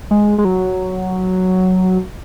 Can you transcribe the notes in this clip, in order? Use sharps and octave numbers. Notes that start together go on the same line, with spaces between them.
G#3
G#3
F#3